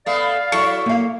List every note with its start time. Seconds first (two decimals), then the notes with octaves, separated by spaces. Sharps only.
0.06 A3 B3 D5 F5
0.52 F#3 E4 A4 C#6
0.86 A#3 F5